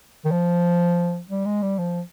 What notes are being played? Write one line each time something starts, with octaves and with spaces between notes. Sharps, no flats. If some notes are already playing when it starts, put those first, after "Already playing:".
D#3
F3
G3
G#3
G3
F3